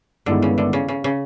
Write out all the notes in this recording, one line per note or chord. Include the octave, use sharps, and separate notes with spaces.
G2 D3 D#3 G#3 B3 E4
C#3
D3
C#3
C#3
C#3